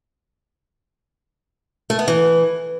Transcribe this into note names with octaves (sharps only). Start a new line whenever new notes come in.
A3
B3
E3